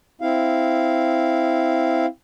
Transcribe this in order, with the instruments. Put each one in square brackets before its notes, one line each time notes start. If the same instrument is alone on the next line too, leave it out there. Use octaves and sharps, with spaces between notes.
[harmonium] C4 E4 F5